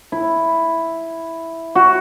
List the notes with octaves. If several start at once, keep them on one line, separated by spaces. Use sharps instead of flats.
E4
F#4